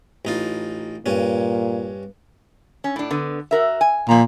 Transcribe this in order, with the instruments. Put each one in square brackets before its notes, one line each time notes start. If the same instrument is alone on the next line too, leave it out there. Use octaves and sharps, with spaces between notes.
[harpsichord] A1 D#4 F4
[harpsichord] G2 C#4 [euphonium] A#2
[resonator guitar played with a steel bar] C#4
A2 D4
D3 B3
F#4 A#4 E5
G#5
[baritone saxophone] A#2 [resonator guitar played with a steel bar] F3 A#5